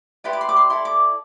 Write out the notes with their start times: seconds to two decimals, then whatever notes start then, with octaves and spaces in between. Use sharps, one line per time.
0.24 E4 G4 B4 D5 C6
0.33 D6
0.41 C6
0.49 D6
0.56 C6
0.70 E4 A4 D5 C6
0.85 D6